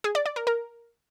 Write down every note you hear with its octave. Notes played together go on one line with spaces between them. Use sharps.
G#4
D5
D5
A#4
A#4